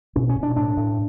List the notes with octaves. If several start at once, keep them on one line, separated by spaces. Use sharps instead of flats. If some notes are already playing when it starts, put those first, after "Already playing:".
B2 C#4
C#4
B2
D4
A2 D4
A2